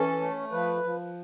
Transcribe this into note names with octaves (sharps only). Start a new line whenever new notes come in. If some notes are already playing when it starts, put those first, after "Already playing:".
Already playing: E3 C#4 A4
A3
F3 B4
F3